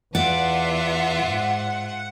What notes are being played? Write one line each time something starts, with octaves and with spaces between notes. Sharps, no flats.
E2 F4 D5 E5 F#5
G#2